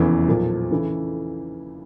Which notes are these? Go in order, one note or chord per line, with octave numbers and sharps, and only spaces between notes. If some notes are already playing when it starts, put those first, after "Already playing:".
Already playing: F1 E2 C#3 E3
B1 A#2 F3
C#3 E3 A3